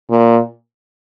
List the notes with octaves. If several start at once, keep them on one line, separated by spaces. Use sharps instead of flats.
A#2